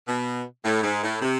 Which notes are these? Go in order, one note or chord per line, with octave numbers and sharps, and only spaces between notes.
B2
A2
G#2
A2
C3